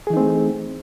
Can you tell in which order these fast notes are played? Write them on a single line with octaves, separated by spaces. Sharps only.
G#4 E3 D#4 C4 A3